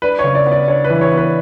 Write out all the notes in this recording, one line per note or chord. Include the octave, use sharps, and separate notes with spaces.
D4 B4
C#5
C#3
D5
B3
D5
D4 C#5
B4
E3
C#5
B3
B4